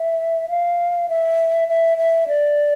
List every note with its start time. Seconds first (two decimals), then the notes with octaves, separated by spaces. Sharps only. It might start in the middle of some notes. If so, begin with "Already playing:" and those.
Already playing: E5
0.49 F5
1.09 E5
1.68 E5
1.98 E5
2.28 D5